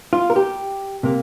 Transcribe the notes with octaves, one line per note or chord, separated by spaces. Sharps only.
F4
A#4
G4
C3 A#3